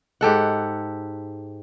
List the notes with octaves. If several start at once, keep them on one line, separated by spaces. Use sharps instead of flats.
G#2 G4 A4 F#5